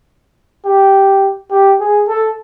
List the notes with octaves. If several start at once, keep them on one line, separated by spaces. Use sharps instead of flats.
G4
G4
G#4
A4